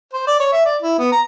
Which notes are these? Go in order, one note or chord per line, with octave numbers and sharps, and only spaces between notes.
C5
D5
C#5
E5
D5
E4
B3
A#5